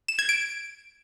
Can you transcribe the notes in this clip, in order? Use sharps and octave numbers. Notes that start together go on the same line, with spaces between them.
E7
G#6
D7